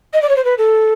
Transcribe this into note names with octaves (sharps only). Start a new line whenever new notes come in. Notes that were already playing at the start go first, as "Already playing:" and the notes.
D#5
D5
C#5
C5
B4
A4